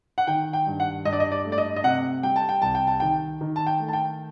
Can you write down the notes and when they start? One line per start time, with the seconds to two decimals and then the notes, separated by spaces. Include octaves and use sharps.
0.18 F#5
0.27 D#3 G5
0.53 G5
0.67 G2
0.80 F#5
1.05 G2 D#5
1.13 D5
1.20 D#5
1.32 D5
1.45 A3
1.52 D5
1.58 D#5
1.76 D#5
1.84 C3 F#5
2.23 G3 G5
2.36 A5
2.49 G5
2.62 C2 A5
2.75 G5
2.87 A5
3.00 D#3 G5
3.41 D#3
3.56 A5
3.67 G5
3.80 A3
3.88 A5
3.93 G5